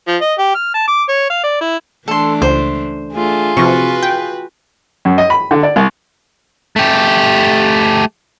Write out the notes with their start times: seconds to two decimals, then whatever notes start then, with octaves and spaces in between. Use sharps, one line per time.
0.08 F3
0.21 D#5
0.39 G4
0.55 F6
0.74 A5
0.87 D6
1.09 C#5
1.30 F5
1.44 D5
1.61 E4
2.08 E3 A3 D4 A4 C6
2.42 C#2 C5
3.13 A3 D4 F4 G#4
3.57 C3 F3 F#4 B4 C#6
4.03 G5
5.05 F#2
5.18 D#5
5.30 B5
5.51 D3
5.63 D5
5.76 C2
6.76 A3 G4